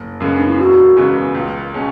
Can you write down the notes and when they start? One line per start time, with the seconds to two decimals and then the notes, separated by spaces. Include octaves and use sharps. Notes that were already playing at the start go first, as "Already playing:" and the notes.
Already playing: F#1
0.20 F#2 C#3 G#3 B3
0.37 D4
0.48 E4
0.58 E1 F#4
0.96 E2 C#3 G#3 B3
1.35 C#2
1.74 B2 G#3 C#4